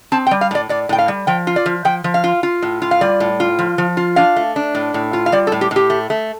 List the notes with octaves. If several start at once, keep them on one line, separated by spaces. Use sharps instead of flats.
C4 A5
G5
G3
F5
A2 D5
A2 D5
A2 G5
F5
G3
F3 G5
F4
D5
F3
F3 G5
F3
F5
F4
F4
A2
F4
F5
G3 D5
A2
F4
F3
F3
F4
D4 F5
A3
D4
A2
A2
F4
F5
G3 D5
A4
A2
G4
A2
G4
A3
A3